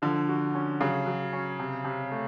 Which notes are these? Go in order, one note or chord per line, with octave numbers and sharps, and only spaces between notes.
D3 F3
F#4
C#4
C#3 F#3
F#3
C#4
C3
C3
A3